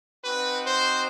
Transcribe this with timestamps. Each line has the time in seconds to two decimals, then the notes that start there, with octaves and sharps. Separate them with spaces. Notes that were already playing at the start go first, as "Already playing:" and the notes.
0.24 C4 D#4 F#4 B4
0.65 C5